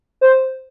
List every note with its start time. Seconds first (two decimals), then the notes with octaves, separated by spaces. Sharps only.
0.21 C5